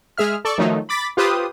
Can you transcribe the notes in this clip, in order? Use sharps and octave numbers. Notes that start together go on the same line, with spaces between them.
G#3 G#4 E5 F6
A4 D5 C#6
D#3 F3 F#3 A3 D#4
B5 D6 A6 B6
F4 G4 B4 C5 D#6